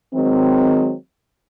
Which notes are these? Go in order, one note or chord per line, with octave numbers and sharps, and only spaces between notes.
D#3 F#3 G#3 C4